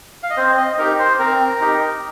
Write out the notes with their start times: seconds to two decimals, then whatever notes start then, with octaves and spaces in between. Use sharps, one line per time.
0.23 F5
0.30 D#5
0.37 C4 C5
0.57 D#5
0.78 D#4 G4 A#4
0.99 C5
1.19 C4 A#4
1.61 D#4 G4